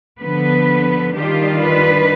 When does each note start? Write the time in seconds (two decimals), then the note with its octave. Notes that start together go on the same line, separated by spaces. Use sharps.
0.20 D3 F3 B3 B4
1.15 D#3 G3 D4 F4 G4
1.62 B4